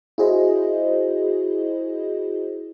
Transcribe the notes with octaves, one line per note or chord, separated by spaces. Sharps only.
E4 F#4 G#4 C5 D#5